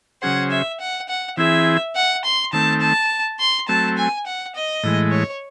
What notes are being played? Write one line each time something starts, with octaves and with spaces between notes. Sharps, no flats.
C#3 F#3 C#4 G#4 C5 F#5
E5
F#5
F#5
E3 C4 E4 G#4 E5
F#5
C6
D#3 A3 C4 A5
A5
C6
F#3 A3 C4 A5
G#5
F#5
D#5
A2 E3 G#3
C#5